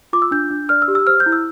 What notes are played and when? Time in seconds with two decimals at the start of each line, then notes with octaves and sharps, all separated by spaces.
0.13 F4 D6
0.22 E6
0.31 D4 G6
0.50 D4
0.69 D5 F6
0.82 E6
0.88 G4
0.95 E6
1.07 C5 F6
1.20 G6
1.26 E4
1.32 E6